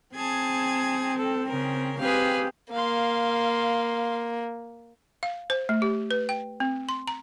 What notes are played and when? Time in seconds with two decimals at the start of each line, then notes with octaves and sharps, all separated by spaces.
0.15 C4 G#4 A5 G#6
1.16 A4
1.46 C#3 A#4
1.98 C4 G4 G#4 B4 F5
2.72 A#3 F5 C6
5.23 F5
5.50 C5
5.69 A3
5.82 G4
6.11 B4
6.29 G5
6.60 C4
6.89 C6
7.07 A#5